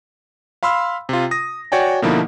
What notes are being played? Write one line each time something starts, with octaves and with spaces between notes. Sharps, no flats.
F5 B5 C6 E6 F6
C3 F4
D#6 A#6
F#4 C#5 D5 G5 G#5
B2 D3 F3 A#3 D#4 E4